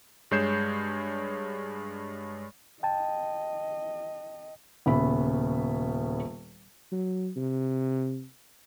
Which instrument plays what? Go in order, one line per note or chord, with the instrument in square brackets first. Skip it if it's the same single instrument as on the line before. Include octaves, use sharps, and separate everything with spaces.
[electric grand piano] G2 G#3 C#5 G6 C7 E7
[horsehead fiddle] D#5 [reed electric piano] G5 A5
[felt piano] D#1 C#3 B3 E5 B5
[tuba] F#3
C3